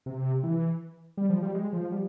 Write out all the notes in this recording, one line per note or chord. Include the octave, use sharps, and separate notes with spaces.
C3
E3
G3
F3
G3
G#3
F3
G3